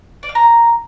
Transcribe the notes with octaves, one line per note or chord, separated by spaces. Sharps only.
D5
F5
A#5